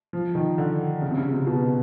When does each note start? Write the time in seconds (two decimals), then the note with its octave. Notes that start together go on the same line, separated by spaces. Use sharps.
0.13 F3
0.35 D#3
0.58 D3
1.02 C#3
1.11 C3
1.17 C#3
1.32 C3
1.47 B2